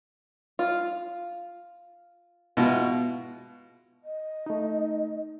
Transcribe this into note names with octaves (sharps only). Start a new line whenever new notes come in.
F4
B2 G#3 E4 F4
D#5
A3 D#4